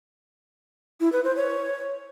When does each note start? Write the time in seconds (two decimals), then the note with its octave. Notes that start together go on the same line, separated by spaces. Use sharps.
1.01 E4
1.12 B4
1.24 C5
1.36 C#5